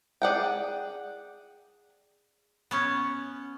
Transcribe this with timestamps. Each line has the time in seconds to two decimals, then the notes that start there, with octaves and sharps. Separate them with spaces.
0.22 G#4 D5 F#5 G5
2.71 B3 C#4 C#5